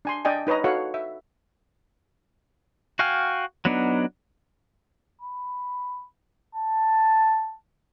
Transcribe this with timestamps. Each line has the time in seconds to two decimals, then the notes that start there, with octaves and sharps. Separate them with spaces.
0.05 D4 G#5 C6
0.25 D4 D5 D#5 G5 G#5
0.47 D#4 B4 C#5 D#5 A#5
0.64 F#4 A4 C#5 F5 F#5
0.94 E5
2.99 F#4 F5 G5 G#5 F6
3.65 F#3 B3 D4 D#4
5.21 B5
6.55 A5